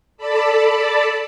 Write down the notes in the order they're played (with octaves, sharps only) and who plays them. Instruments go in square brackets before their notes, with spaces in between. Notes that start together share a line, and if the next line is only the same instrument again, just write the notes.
[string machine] A4 D5 A5 B5